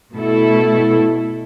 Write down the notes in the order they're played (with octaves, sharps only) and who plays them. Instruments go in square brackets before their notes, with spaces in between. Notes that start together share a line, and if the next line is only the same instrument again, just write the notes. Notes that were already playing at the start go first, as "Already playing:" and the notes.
[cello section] B2 A3 E4 A4